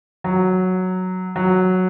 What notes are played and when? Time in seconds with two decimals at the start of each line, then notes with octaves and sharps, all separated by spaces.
0.24 F#3
1.36 F#3